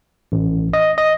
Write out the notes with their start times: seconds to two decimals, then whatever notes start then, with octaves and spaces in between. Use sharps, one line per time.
0.32 A1
0.73 D#5
0.98 D#5